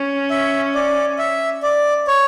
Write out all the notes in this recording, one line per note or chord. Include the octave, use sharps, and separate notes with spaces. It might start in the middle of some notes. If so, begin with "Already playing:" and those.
Already playing: C#4
E5
D5
E5
D5
C#5